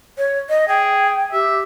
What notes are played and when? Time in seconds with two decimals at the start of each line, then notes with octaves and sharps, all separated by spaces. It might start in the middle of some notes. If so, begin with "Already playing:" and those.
0.18 C#5
0.49 D#5
0.68 G#4 G5
1.33 G4 E5